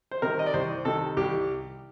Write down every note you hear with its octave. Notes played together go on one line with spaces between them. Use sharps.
C5
C3 D#3 G3 A#4
D#5
D5
C2 C5
C3 D#3 G3 A4
C2 G4